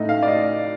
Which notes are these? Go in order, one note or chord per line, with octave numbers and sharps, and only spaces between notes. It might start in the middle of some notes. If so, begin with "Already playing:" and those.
Already playing: A2 A3 D#4 D#5
F5
D5
D#5